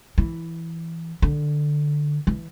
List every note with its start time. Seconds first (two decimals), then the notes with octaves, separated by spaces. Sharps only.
0.18 E3
1.22 D3
2.27 E3